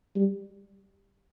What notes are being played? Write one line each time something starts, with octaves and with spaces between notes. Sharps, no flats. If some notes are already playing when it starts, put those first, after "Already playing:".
G3